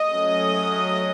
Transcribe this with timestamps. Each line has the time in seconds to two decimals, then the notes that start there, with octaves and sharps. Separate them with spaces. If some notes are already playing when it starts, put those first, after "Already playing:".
Already playing: D#5
0.12 F#3 A3 C#4